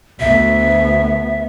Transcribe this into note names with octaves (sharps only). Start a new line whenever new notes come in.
D2 B3 E5